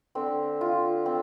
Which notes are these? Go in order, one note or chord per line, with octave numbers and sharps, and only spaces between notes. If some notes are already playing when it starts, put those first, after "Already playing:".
D3 C4
F4
C4